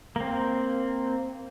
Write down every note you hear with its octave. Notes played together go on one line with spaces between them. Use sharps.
A#3 C4